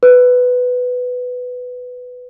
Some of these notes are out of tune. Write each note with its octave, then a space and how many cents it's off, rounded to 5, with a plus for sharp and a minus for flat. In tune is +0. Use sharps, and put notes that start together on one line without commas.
B4 +10